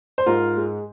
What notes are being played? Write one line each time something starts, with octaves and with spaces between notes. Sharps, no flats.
C5
G#2 F4 A#4
G#3